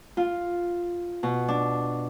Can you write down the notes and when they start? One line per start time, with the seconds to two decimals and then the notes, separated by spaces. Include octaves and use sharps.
0.17 F4
1.23 B2
1.48 D4